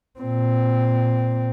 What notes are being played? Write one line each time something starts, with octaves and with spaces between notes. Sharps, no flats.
A#2 C4